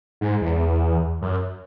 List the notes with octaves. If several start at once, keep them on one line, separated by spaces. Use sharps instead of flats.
G#2
E2
F#2